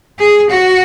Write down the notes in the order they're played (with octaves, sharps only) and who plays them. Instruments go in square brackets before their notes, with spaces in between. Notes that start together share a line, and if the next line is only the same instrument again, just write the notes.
[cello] G#4
F#4